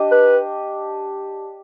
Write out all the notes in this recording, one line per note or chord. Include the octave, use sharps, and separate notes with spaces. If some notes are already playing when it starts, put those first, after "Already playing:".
Already playing: D4 G4 D#5
B4